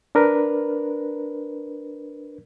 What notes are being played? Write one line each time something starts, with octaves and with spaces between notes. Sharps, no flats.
D4 A#4 B4